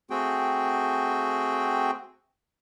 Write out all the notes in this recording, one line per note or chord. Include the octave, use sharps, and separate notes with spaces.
A3 C4 F#4 G#4 G5